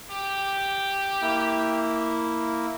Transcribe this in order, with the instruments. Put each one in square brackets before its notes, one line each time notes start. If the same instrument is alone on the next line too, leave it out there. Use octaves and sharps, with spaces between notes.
[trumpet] G4
[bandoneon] A#3 E4